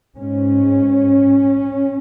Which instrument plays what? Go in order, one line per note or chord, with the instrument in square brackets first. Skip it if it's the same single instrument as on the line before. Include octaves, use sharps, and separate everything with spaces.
[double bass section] G#2 C#4